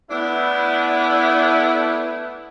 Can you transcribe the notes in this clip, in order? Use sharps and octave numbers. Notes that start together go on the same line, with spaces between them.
A3 B3 D4 E4